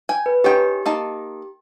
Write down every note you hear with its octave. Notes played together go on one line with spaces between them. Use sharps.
G5 G#5
B4
C#4 D#4 G4 G5
A#3 D#4 A5